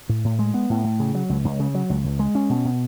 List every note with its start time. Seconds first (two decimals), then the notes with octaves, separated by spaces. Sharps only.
0.09 A2
0.24 A2
0.39 G#3
0.54 B3
0.70 A2
0.84 A2
1.00 C#3
1.15 F#3
1.29 C#2
1.44 C#2
1.60 C#3
1.75 F#3
1.90 C#2
2.04 C#2
2.19 G#3
2.35 C#4
2.50 B2
2.65 B2